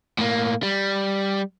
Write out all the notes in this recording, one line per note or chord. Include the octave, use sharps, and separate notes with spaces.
A2 A#3
G3